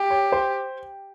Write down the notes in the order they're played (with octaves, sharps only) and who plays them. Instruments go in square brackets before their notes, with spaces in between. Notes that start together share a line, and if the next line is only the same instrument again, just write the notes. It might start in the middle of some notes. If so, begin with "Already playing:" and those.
Already playing: [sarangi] G4
[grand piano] C#5
C5